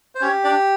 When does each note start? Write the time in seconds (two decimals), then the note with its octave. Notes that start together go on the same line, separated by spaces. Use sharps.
0.15 C5
0.21 C#4 G4 C#5
0.44 D4 D5